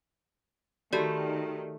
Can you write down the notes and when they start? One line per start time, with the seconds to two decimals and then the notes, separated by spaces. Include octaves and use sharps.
0.93 D#3 A3 F#4 G4 D5